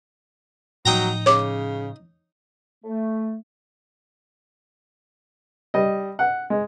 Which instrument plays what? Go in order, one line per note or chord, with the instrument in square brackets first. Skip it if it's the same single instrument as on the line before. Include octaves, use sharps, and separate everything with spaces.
[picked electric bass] A2 F3 [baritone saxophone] F#3 [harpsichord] D#4 G5 A#5
[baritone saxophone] C#3 [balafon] C#5 D6
[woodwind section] A3
[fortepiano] G3 D#5
F#5
G#3